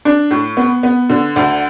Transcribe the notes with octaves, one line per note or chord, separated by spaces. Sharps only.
D4
A2
B3
B3
D3
D2